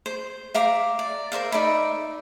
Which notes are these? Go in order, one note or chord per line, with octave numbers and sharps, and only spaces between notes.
C5
E5 F5 A#5 D6
D5
A#4 C5 E5 F5
D#4 D5 E5 B5